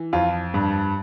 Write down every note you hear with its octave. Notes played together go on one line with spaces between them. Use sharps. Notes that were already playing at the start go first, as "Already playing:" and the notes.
Already playing: E3
F2 F4
G2